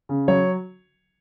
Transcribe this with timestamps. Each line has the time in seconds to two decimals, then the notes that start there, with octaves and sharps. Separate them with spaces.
0.09 C#3
0.28 F#3 C#5